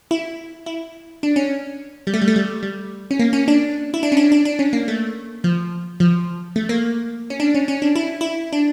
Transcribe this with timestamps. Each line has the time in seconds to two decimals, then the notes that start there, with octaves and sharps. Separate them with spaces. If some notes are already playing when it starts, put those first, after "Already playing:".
0.11 E4
0.66 E4
1.23 D4
1.36 C#4
2.07 G3
2.14 A3
2.22 G3
2.28 A3
2.36 G3
2.63 G3
3.11 C#4
3.19 A#3
3.33 C#4
3.48 D4
3.94 E4
4.03 D4
4.12 C#4
4.17 D4
4.32 D4
4.45 D4
4.59 C#4
4.73 A#3
4.88 A3
5.44 F3
6.00 F3
6.56 A3
6.69 A#3
7.30 C#4
7.40 D4
7.55 C#4
7.68 C#4
7.82 D4
7.95 E4
8.21 E4
8.52 D4